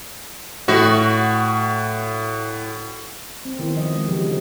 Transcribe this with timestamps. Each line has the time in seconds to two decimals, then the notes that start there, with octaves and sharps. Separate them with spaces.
0.68 A2 F#4
3.45 C4
3.59 D#3 B3 E4
3.75 F3 D#5
3.93 G#3
4.08 C#3 F3 F#3 G4
4.23 D3 G3